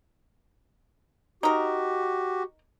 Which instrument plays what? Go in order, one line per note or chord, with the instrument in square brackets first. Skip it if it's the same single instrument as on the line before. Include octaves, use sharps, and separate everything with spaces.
[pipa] D#4 A#4 [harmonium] F#4 G4